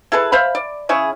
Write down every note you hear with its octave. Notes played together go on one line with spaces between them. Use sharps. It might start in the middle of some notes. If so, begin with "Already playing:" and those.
E4 G#4 A4 B4
C5 E5 F5 B5
D5
C#3 E4 G#4 C#6